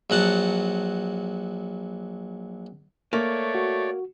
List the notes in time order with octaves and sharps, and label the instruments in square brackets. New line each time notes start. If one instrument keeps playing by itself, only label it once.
[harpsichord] A#1 F#3 F#5 A5
[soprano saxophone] A3 [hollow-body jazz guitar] A#3 [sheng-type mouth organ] C#5 D5
[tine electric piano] F#4